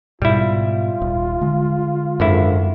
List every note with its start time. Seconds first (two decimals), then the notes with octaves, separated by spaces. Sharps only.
0.22 G#2 B2 G3 E4 F4
1.02 D#1
1.41 D3 G#3
2.20 G#1 F#2 D3 E4